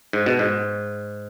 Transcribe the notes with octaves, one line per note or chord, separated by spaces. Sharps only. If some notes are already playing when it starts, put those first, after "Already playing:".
G#2
B2
G#2